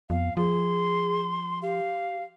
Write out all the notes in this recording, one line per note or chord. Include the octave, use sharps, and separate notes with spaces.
F2 B3 F5
F3 G#4 C6
G4 F5